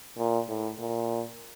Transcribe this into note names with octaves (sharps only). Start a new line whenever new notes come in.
A#2
A2
A#2